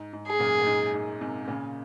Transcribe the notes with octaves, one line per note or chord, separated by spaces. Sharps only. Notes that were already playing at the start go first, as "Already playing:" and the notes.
Already playing: G#2
G#2
G#4
F#2 A#2
A#2
G#2
G#2
G#2 C3
A#2 C#3